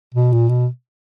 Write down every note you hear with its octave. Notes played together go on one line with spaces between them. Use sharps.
B2
A#2
B2